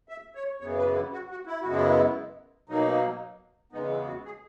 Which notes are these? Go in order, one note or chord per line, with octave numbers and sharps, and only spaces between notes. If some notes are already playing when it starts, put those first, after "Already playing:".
E5
C#5
F#2 C#3 E3 B3 C#5
B4
E4
F#4
F#4
E4
F#2 C#3 G#3 B3 F#4
E4
B2 F#3 A#3 D#4
E2 C#3 G#3 B3 D#4
E4
F#4
G#4